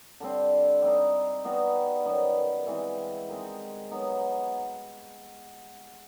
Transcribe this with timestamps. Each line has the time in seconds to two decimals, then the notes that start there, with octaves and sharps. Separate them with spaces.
0.20 D3 G3 C4
0.82 G3 C4 D#4
1.45 G3 B3 D#4 F#4
2.05 F#2 D#3 G3 B3
2.67 E3 G#3 C4
3.29 D#3 G#3 C4
3.91 F#3 B3 D#4